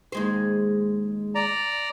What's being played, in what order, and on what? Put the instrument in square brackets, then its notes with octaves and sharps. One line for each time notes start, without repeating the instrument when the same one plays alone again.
[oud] D#2 G#3 C5
[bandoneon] D5 A#5